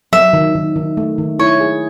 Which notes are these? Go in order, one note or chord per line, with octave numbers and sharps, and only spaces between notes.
F#3 E5
D#3
D#3
D#3
A3
D#3
E4 C#5
G#4